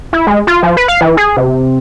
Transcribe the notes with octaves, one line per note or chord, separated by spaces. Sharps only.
E4
G#3
F4
F3
B4
F5
E3
G#4
C3